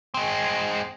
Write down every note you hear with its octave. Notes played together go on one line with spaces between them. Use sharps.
G#3 C4